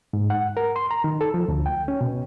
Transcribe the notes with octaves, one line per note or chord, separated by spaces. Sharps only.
G#2
F#5
A#4
C6
A#5
D#3
A4
F3
D2
G5
C#4
B2